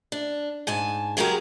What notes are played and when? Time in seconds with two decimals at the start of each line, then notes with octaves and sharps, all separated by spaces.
0.12 D4
0.67 G#2 G#5 A5
1.17 C#3 F#3 G#3 G4 G#4 A#4